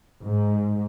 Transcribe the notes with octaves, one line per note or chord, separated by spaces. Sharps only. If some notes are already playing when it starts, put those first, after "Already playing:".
G#2